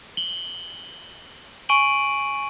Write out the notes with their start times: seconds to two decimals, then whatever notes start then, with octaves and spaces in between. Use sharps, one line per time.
0.17 F#7 G7
1.69 G#5 C#6 D7 D#7 F#7